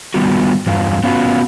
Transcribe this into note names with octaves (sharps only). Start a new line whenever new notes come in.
D#3 G3 B3 F4 F#4
E2 G2 F4
B3 C#4 F4 F#4 A#4 B4